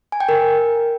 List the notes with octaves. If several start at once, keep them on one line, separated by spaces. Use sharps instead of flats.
G#5
G5
A#4